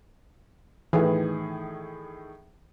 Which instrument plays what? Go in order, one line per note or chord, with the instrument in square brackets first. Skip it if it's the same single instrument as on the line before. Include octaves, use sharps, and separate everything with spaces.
[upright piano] A2 D#3 G#4 [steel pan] E3